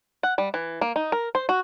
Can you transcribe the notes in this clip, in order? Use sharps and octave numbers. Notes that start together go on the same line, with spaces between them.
F#5
G3
E3
A#3
D#4
A#4
C5
F#4